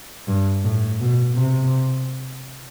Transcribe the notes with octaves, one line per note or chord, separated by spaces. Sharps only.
G2
A2
B2
C3